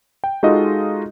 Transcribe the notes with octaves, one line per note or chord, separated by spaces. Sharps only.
G5
G#3 D#4 F4 F#4 A4 D#5